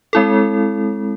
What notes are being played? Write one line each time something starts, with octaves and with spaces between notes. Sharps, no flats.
G#3 C4 E4 A4